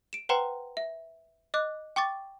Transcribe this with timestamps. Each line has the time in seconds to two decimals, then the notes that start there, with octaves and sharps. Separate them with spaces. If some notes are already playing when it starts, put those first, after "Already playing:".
0.13 D7 E7
0.29 B4 C5 F#5 G5 A#5 C6
0.77 E5
1.54 D#5 D6 F#6
1.96 G5 C#6 D6 A6